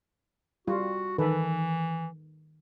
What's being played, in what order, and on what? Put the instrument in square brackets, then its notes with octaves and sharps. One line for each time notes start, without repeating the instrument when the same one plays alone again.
[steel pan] G3 F4 [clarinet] F#4
[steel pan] D#3 A4 B4 [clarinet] E3